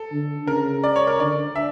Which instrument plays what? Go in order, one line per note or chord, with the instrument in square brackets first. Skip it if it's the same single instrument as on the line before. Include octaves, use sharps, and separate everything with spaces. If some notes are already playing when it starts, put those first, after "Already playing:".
Already playing: [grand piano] A4
[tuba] D3
[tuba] C#3 [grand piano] A#4
[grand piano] D5
C#5
A#4
[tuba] D3 [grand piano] D5
[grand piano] E5